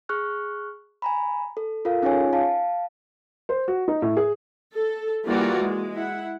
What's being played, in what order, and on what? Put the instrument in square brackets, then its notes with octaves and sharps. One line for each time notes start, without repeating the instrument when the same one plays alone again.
[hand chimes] G#4 C#6 F6 F#6
G#5 A#5 B5
A4
F4 A4 A#4 F5
C#4 D#4 F4 G#4 C#5 G#5
F5 A5
[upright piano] C5
F#4
D#4
A2
G#4
[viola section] A4
E3 G3 A#3 F4 F#4 D5
G#3
E4 F#5